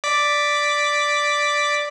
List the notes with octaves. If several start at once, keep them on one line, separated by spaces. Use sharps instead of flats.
D5 D6 B6